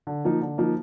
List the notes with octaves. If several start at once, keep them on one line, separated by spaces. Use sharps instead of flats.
D3
F3 A#3 D#4
D3
F3 A#3 D#4